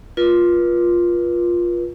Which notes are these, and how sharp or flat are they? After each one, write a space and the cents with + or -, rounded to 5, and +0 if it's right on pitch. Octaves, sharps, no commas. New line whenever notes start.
F4 +0 B4 -45